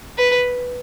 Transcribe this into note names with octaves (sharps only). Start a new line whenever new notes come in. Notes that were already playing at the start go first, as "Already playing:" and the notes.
B4